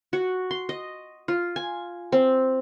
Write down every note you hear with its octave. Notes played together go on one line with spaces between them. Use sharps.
F#4
C6
D#5
F4
G#5
C4